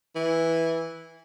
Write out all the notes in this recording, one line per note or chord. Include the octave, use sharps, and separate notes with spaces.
E3